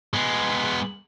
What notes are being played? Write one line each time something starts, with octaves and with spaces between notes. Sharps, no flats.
G#3 B3